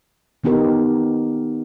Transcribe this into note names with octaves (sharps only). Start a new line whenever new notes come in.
D#3 B3 D#4 G4 A#4